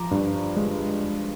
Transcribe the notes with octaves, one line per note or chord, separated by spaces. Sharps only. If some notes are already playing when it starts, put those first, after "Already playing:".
Already playing: F3 A#5 D6
G2
G#3